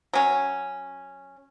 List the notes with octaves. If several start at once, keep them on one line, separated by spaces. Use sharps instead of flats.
F#3 C#4